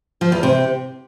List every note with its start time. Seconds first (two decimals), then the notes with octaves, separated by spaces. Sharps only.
0.21 F3
0.32 E2
0.43 C3